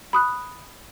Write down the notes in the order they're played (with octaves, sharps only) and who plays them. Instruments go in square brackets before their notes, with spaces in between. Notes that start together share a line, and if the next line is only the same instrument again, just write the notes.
[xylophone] B5 D#6 F#6